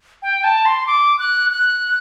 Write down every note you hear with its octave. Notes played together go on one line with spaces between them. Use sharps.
G5
A5
C6
D6
F#6
F#6